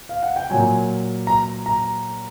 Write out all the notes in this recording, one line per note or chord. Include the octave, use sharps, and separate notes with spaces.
F5
F#5
G5
A#2 F#3 G#5
A#5
A#5